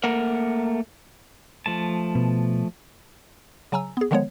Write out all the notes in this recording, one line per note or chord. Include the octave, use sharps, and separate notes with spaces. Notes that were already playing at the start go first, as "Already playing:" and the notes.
A3 A#3 A#4 F#5
F3 A3 A5
B2
C#3 F#3 G#5 A#5 E6
B3 G#4
D3 D#3 F3 G#3 B3 C#5